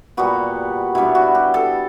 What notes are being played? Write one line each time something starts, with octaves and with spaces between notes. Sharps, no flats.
A#2 G3 B3 F#4
B2 G3 B3 D4 E4
F#4
G4
A4